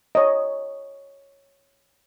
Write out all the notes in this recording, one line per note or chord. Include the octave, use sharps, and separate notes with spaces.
C#5 D#5